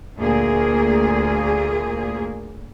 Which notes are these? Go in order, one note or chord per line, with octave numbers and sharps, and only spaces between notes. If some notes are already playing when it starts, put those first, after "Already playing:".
D2 A#2 A#3 G#4